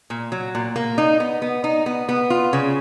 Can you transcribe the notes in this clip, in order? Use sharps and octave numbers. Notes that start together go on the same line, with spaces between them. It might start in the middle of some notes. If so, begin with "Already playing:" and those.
A#2
F#3
A#2
A#3
D#4
B3
B3
D#4
B3
B3
F4
C#3